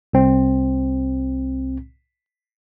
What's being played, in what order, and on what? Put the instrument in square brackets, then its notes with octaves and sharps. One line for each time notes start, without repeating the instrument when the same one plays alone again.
[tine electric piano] C2 C4